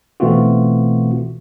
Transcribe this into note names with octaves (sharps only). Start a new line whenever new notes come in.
B2 E3 A3 C4 F4 F#4